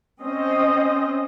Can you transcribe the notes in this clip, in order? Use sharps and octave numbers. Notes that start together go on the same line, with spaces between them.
C4 C#4 C5 D#5